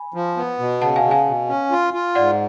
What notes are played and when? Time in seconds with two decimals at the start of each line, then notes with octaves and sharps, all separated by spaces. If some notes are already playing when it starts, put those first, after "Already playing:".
Already playing: G#5 B5
0.14 F3
0.37 B3
0.59 B2
0.81 C#3 F#5 A5
0.96 F5 G#5
1.04 C#3
1.11 F5 G#5
1.26 B2
1.49 C#4
1.72 F4
1.94 F4
2.15 G#2 D5 F#5